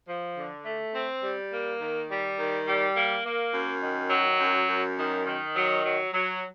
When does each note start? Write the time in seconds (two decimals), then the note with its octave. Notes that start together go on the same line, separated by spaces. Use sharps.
0.08 F3
0.37 D3
0.65 A3
0.94 C4
1.23 G3
1.52 A#3
1.81 D#3
2.09 G3
2.39 D#3
2.66 G3
2.95 A#3
3.24 A#3
3.53 F#2
3.82 D#3
4.10 F#3
4.39 F#2
4.67 F#2
4.97 D#3
5.26 D#3
5.55 F#3
5.83 F#3
6.12 F#3